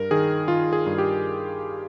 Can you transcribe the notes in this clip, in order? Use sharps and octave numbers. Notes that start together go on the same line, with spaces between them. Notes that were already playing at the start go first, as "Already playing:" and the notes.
Already playing: G2 A#4
D#3 G#4
D#3 F4
G#4
G2
G4